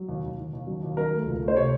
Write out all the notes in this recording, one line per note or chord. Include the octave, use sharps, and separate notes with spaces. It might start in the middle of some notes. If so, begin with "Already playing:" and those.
Already playing: F#3
D#2
D#2
D#2
D#2
F#3
D#2
F#3 A#4
A3
C#2
A3
C5
C3 C#5